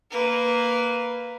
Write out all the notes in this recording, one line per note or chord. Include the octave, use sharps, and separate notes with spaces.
A#3 B4